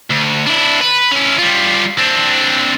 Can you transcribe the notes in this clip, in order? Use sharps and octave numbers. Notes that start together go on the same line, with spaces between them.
D2
D4 E4
B4
C#4 E4
G3 F4
C4 D4